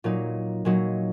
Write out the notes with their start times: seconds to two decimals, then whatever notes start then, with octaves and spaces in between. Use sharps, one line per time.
0.04 A#2 F#3 D#4
0.65 A#2 F#3 D#4